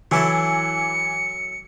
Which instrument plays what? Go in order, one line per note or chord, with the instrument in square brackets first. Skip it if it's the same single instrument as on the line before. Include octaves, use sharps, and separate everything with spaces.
[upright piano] E3 [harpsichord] F#3 E4 A4 [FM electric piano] G#5 D6 [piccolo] C#7